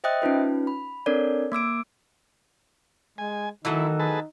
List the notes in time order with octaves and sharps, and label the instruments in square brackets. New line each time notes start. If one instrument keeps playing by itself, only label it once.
[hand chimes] C5 D#5 E5 G5 D#6 F#6
C#4 D#4 F4 B4
B5
C4 D4 A4 A#4 C#5 D5
A#3 D6 E6 D7
[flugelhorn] G#3 [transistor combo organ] G#5
[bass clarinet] D#3 [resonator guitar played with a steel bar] E3 F#3 A3 [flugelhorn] D#4 [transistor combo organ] E4
[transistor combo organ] G#4 B4 A5